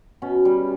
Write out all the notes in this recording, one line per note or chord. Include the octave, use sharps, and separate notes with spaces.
B2 C#4
G3